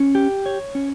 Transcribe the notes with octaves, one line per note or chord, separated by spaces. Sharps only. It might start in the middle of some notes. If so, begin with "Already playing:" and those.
Already playing: C#4
G4
C#5
C#4